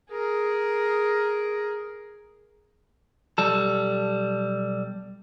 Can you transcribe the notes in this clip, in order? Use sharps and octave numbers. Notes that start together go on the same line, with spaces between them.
G#4 A#4
B1 G3 A4